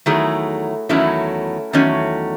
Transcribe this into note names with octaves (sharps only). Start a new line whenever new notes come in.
E2 D#3 F#3 A3 E4 G#4
E2 D#3 F#3 A3 C#4 E4
E2 D#3 F#3 A3 C#4